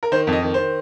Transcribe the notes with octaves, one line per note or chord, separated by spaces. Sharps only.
A#4
D#3 C5
F2
D#5
D#3
D#3 C5